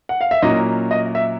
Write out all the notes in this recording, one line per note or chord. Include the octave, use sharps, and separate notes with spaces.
F#5
F5
E5
A#2 F#3 A#3 C#4 E4 D#5
D#5
E5